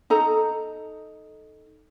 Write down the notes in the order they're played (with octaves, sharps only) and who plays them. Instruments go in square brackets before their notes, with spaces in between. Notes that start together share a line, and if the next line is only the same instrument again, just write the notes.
[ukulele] D#4 A4 A#5